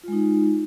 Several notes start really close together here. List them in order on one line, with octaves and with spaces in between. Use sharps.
F4 G#3 D#4